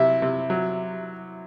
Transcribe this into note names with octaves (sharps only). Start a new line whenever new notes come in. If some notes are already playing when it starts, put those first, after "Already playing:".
Already playing: C3 F#3 E4 E5
C3
F#3